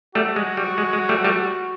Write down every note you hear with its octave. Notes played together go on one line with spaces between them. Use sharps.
G3 A3 F#4
G#3
G3
G#3
G#3
G3 A3
G3 A3